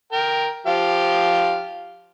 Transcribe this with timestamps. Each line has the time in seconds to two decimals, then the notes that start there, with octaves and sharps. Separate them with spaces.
0.12 A#4 G5
0.67 F3 G4 F5